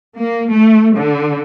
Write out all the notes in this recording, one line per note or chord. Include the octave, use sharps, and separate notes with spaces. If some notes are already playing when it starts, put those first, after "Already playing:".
A#3
A3
D3